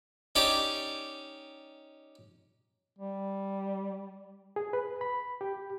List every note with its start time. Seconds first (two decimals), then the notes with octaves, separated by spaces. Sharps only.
0.35 C#4 D#4 G4 D5
2.98 G3
4.56 G#4
4.73 B4
5.01 B5
5.41 G4